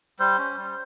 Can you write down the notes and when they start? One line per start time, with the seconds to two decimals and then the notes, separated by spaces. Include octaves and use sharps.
0.20 G3 C5
0.38 C#4
0.57 G3